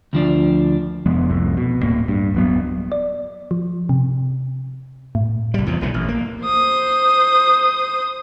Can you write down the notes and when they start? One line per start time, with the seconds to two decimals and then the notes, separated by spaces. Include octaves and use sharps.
0.13 D2 F3 D4
1.06 F1 F3 G#3 B3
1.29 C2 F2 A2
1.57 B2
1.81 D1 A2 A#3
2.08 G2
2.34 D1 F#3 B3
2.92 D5
3.51 F3
3.89 C3
5.15 A2
5.54 C2 G3
5.66 E2 C3 F3
5.81 B1 A#2 D3 E3
5.94 A1
6.08 A#3
6.45 C5 D#6